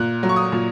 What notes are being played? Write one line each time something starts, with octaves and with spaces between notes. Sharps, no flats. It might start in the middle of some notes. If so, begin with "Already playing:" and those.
Already playing: A#2 F#6
F#3
C#6
D#6
A#2